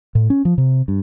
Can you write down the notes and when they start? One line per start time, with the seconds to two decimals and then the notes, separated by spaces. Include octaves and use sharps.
0.15 A2
0.30 C#4
0.45 F3
0.58 C3
0.88 G2